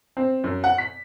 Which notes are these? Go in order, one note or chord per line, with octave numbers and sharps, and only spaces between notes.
C4
F#2
F#5
B6